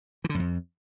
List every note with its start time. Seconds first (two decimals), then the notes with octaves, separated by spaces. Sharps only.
0.24 E3
0.29 D3
0.34 F#2
0.39 F2